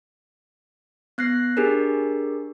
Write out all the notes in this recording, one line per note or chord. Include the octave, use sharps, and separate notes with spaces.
B3 F#6 A#6 C7
D4 G4 G#4 A#4